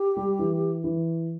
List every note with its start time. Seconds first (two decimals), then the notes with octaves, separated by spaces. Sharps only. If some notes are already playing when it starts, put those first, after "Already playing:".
Already playing: G4
0.17 G3
0.39 E3
0.84 E3